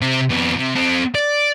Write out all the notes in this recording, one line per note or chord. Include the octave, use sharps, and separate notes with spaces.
C3 C4
F2 B3
C3
C4 A4
D5